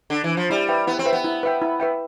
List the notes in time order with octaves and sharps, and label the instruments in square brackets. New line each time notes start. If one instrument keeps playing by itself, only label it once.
[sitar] D3
E3
F3
[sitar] G3 [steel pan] E4
[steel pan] B4 E5 G5
[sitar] B3 [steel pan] E4
[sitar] C4
[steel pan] B4 E5 G5
[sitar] B3
[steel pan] E4
B4 E5 G5
E4
B4 E5 G5